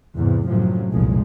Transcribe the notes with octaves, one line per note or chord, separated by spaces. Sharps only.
E2 G#2 C3
F#2 A2 C3 F3 F#3
F1 C2 F#2 A#2 F3 G#3